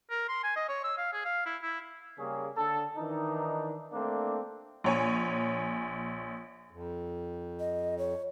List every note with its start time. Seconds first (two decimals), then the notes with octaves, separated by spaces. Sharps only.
0.11 A#4
0.29 C6
0.44 G#5
0.56 D#5
0.69 C#5
0.84 E6
0.98 F5
1.13 G#4
1.25 F5
1.46 E4
1.62 E4
2.18 C#3 G3 A#3 C#4 G#4
2.57 D3 A4
2.97 D#3 E3 D4 D#4
3.92 A3 A#3 C4 D4
4.84 A#1 C#5 G#5
6.71 F2
7.60 D#5
7.98 C#5